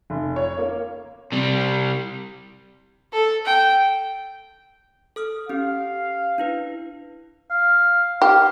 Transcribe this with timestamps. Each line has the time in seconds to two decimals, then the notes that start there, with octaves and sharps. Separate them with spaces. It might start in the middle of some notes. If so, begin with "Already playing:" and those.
0.10 F1
0.36 C#5
0.58 A#3
1.32 C3 G3
3.13 A4
3.45 G5
5.16 A4 D#6 F6
5.49 C#4 G4 F5
6.38 D4 E4 B4
7.51 F5
8.22 G4 F5